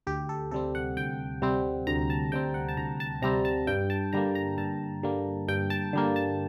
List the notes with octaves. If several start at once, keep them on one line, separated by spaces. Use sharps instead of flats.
D2 G4
A4
C3 G3 C4 A4
F#5
D2 G5
C3 G3 C4
D2 A#5
A5
C3 G3 C4 G5
F#5
A5
D2 A#5
A5
C3 G3 C4 A#5
A5
G2 G5
A5
D3 G3 A#3 A#5
A#5
G2 A5
D3 G3 A#3
G2 G5
A5
D3 G3 A#3
A5